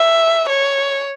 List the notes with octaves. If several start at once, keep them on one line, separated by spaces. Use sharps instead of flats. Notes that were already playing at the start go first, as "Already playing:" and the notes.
Already playing: E5
C#5